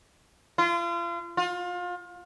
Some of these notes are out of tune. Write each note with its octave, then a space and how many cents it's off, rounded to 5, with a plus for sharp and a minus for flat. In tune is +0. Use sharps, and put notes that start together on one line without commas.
F4 -35
F4 +30